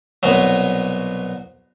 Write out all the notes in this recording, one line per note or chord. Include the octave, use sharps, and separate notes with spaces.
C2 B2 F#3